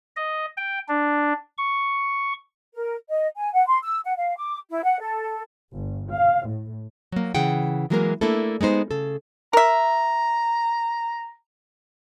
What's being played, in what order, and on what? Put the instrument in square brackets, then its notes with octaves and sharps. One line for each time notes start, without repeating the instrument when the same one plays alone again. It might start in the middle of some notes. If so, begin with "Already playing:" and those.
[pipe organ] D#5
G5
D4
C#6
[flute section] A#4
D#5
G#5
F#5
C6
E6
F#5
F5
D6
E4
F#5
A4
[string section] G1
F5
A2
[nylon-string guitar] F#3 A#3
C#3 E3 G#4 F#5 G5
E3 F#3 G#3 A#3 A4 A#4
A3 A#3 D4 E4 A4
G#3 B3 D#4 C5
C#3 A4
[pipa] A#4 E5 [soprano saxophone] A#5